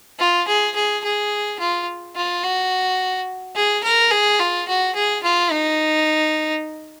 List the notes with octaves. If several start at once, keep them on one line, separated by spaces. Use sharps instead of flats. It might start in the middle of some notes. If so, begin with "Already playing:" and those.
F4
G#4
G#4
G#4
F4
F4
F#4
G#4
A#4
G#4
F4
F#4
G#4
F4
D#4